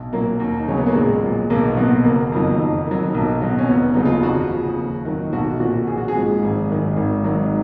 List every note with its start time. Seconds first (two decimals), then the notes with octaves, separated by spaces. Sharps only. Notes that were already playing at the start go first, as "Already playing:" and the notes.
Already playing: B1
0.12 A#2 F#3 A#3
0.40 D#2
0.59 D#4
0.68 C#3 F#3 C#4
0.78 B3
0.86 A#3
0.95 A#1 G#3
1.22 A#2 F#3
1.50 B1 A#3
1.68 B3
1.77 B2 F#3 A#3
2.04 F#1 A#3
2.32 F2 D#3 F#3
2.59 F2
2.86 D#3 F#3
3.14 B1 A#3
3.41 B2 F#3
3.59 C#4
3.68 F1 B3
3.94 D#2 C#3 F#3 D#4
4.05 F4
4.23 F2 F#4
4.50 C#3 F3
4.78 D#2
5.05 D#3 F#3
5.33 B1 F#4
5.60 A#2 F3 F#4
5.87 A#1 G#4
5.98 F#4
6.08 G#4
6.15 G#2 F3
6.42 G#1
6.69 F#2 D#3
6.97 G#1
7.24 G#2 D#3 F#3